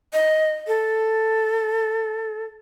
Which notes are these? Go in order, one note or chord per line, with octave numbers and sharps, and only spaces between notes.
D#5
A4